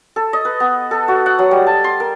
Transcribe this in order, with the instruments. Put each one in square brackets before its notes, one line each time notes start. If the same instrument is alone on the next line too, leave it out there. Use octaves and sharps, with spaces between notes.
[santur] A4
D#5
B4
B3
A4
F#4
F#5
F#3
G3
A5
C6
A#4